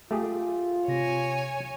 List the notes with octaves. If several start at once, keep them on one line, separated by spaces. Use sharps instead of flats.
A3 F4 G4 G#4
C3 C#5 G#5 A#6